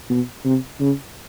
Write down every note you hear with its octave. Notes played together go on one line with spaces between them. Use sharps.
B2
C3
C#3